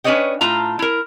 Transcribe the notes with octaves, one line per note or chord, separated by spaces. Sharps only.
C#4 D4 B4 C#5 D#5 G5
A2 F4 A#5
E4 A#4